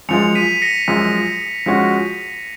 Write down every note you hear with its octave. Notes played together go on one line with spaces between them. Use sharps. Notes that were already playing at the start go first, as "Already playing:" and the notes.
F#2 F3 G#3 C#7 F7
B6 D#7
A#6 C#7
F#2 F3 G#3
F3 G#3 C#4 F#4